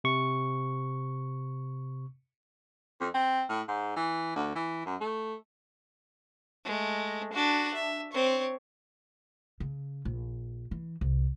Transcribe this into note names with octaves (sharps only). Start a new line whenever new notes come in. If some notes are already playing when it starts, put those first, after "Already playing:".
C3 C#6
F2
C4
A2
G#2
E3
D2
E3
F#2
A3
G#3 A3
D4 F#4
E5
C4 C#5
C#3
A#1
E3
C2